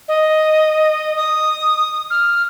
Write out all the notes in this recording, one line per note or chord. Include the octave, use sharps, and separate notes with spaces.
D#5
D#6
F6